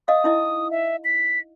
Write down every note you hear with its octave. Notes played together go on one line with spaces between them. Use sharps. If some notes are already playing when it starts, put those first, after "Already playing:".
D#5 F5 D#6
D#4 E4 D#5
E5
B6